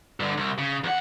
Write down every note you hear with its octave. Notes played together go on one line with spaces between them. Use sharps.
G2 D3
C2
C#3
E2 F#5